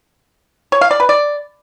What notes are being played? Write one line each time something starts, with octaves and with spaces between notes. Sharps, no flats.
C#5
F5
D5
B4
D5